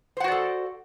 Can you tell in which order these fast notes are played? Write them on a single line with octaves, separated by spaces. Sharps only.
C5 F#5 F#4 D5 A4